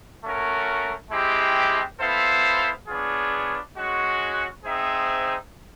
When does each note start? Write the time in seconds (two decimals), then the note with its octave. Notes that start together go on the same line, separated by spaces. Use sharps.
0.23 A3 C#4 F#4 A#4
1.11 G#3 C4 E4 G4
2.00 B3 E4 A4 C5 F5
2.88 B3 D4 F4 G#4 C#5
3.76 G#3 C#4 F#4
4.65 C4 D#4 G#4 C5 E5